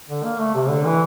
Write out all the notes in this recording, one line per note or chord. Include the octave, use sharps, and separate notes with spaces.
D3
A#3
A3
C3
D3
E3